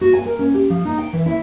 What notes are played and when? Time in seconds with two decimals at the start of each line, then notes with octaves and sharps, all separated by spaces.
0.01 F#4
0.13 G#5
0.25 A#4
0.39 C#4
0.54 G4
0.70 F3
0.85 D#4
0.98 G5
1.13 E3
1.26 E4